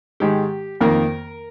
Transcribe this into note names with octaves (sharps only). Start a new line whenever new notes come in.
G#2 D#3 G#3 G4
F2 D#3 A#3 A#4